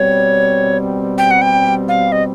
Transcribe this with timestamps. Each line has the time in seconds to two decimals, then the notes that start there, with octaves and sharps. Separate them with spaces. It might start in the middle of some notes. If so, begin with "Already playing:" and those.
Already playing: B2 G3 C4 C#5
1.18 G5
1.31 F#5
1.42 G5
1.88 F5
2.12 D#5